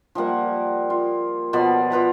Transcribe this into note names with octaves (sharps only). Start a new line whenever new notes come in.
F3 G3 A#3 F#5
F4
B2 F3 D5 B5
F3 B4 A#5 B5